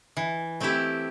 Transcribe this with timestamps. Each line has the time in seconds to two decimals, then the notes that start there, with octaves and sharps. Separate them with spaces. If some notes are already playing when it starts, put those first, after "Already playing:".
0.17 E3
0.60 A3 C4 E4 G4